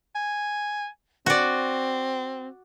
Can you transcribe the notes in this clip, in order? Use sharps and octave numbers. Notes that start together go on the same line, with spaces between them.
G#5
C4 F#4 D5